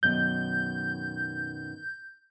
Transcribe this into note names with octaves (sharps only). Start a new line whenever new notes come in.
F#2 B2 D#3 G6